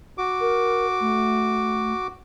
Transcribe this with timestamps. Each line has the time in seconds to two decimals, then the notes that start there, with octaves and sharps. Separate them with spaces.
0.18 F#4 D6
0.41 A#4
1.01 A3